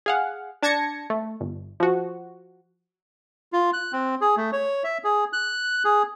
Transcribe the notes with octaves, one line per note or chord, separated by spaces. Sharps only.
G#4 F5 F#5
D4 A5 G#6 A#6 C#7
A3
G1
F3 F#4
F4
F#6
C4
G#4
A3
C#5
E5
G#4
F#6
G#4